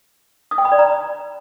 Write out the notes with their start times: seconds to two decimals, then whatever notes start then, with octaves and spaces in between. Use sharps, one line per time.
0.51 D#6
0.58 G5
0.65 B5
0.72 D5
0.79 A#5